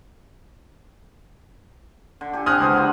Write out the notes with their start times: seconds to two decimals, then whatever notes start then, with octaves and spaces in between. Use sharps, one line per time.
2.21 D3
2.33 G4 A4 G#5
2.46 C4 G#5 D#6 F6 F#6
2.60 C#2 B4 C5 F#5
2.76 D4 F4